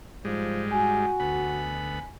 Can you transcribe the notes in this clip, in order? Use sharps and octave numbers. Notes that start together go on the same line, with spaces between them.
G#2 F3 G3 G#3
F#4 G#5
D2 B3 B5